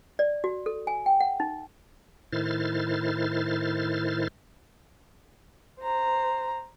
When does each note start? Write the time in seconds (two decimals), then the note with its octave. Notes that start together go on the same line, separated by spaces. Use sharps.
0.19 D5
0.44 F#4
0.66 A4
0.87 G#5
1.06 G5
1.21 F#5
1.40 D#4
2.33 A2 D#3 E4 C5 F6 A6
5.80 C5 A#5